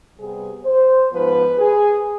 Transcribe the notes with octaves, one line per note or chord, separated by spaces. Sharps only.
C3 G3 B3 G#4
C5
G#2 F3 B3 B4
G#4